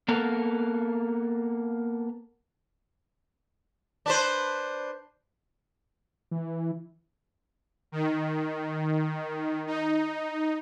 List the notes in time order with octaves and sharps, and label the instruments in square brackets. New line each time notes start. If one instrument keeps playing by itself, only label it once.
[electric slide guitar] A#3 B3 A4 A#4
[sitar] D4 B4 C5
[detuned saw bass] E3
[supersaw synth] D#3
D#4